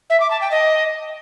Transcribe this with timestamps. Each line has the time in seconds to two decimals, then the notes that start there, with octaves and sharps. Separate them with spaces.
0.10 E5
0.20 D6
0.31 A5
0.41 G5
0.51 D#5